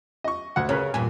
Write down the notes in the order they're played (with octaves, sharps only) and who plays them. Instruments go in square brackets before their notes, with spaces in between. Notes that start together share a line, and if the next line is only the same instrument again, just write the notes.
[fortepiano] D#5 C#6
D2 F#5
[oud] C#3 [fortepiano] C#4 A#4 B4
[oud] E2 G2 A#2 [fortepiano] G#5